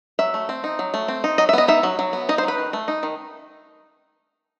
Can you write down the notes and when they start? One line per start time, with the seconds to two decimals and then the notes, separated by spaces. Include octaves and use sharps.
0.19 F#3 E5
0.34 A3
0.49 C4
0.64 D#4
0.79 F#3
0.94 A3
1.08 C4
1.24 D#4
1.38 F#3 D#5
1.49 E5
1.53 B3 D#5
1.68 D#4 E5
1.83 F#3
1.99 F#3
2.13 B3
2.29 D#4 D#5
2.38 C5
2.43 F#3 B4
2.58 D#3
2.73 A3
2.88 D#4
3.03 D#3